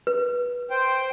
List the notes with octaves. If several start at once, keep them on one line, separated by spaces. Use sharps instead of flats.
B4
C5 G5